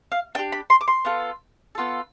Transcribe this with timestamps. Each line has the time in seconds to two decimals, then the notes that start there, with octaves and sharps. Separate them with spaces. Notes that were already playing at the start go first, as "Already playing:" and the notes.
0.12 F5
0.35 D4 G5
0.39 G4
0.52 B5
0.70 C6
0.81 D6
0.88 C6
1.05 B3 F4 A4
1.75 B3 F4 A4